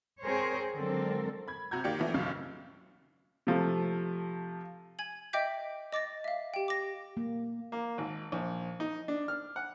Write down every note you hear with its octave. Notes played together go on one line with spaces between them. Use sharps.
C4 G#4 A#4 C5 C#5
D3 F#3 G#3 C4 A4 A#4
B5 G#6
C3 F#4 A#5 G6 G#6
D#3 A#3 G4 D5 C#7
E3 F3 A3 B3
B1 F#2 C#3 F5
C3 F3 A3
G#5 G#6 F#7
D#5 E5 G5 D6 G6 B6
D#5 D6 A6 A#6
E5 F5
G4 G5
D6 A#6
A#3
A#3
G#1
A#1
D#4
D4
F6
F#5